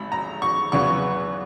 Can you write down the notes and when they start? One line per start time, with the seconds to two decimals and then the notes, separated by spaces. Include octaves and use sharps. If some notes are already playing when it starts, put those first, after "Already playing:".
Already playing: G#1 B5
0.12 A#5
0.42 C#6
0.72 E2 C#3 F#3 B3 C#6